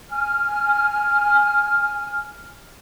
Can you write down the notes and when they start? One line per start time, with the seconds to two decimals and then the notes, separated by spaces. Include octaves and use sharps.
0.10 G#5 F6